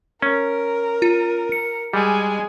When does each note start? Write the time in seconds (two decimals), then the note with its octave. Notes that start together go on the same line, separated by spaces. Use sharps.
0.22 C#4 A#4
1.02 F4
1.52 C#7
1.94 G3 G#3 G#5